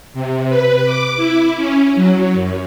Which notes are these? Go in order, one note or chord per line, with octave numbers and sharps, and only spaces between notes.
C3
B4
D6
E4
C#4
F#3
F#2